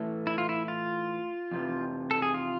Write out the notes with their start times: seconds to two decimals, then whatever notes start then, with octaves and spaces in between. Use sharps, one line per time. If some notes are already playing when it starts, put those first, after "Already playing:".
Already playing: A2 E3 A3
0.27 E4
0.38 F4
0.49 E4
0.68 F4
1.51 F2 C3 E3
2.11 A4
2.22 G#4
2.34 F4